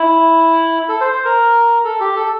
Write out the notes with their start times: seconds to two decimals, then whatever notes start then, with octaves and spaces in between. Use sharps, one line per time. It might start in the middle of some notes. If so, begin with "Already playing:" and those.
Already playing: E4
0.89 A4
1.01 C5
1.12 C5
1.25 A#4
1.85 A4
2.00 G4
2.16 A4